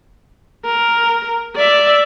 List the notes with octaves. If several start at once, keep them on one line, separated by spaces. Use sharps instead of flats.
A#4
D5 E5